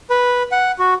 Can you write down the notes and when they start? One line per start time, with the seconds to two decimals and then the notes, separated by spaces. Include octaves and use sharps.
0.10 B4
0.52 F#5
0.79 F#4